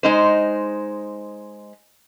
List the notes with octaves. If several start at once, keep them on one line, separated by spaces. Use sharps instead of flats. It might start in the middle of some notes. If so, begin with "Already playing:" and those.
G#3 D#4 C5